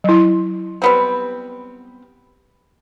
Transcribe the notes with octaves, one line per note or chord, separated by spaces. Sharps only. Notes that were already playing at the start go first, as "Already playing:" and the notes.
F#3 E4
G3 B3 C4